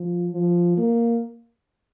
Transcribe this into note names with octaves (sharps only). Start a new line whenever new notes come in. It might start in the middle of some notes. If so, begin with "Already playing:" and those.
Already playing: F3
F3
A#3